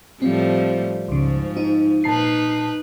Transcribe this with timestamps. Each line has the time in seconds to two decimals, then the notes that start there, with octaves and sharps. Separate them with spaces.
0.22 A2 F3 G3 C4
1.08 C#2 G#2 C#3 F3
1.57 D#4
2.04 A#2 D#4 B4 A5 C7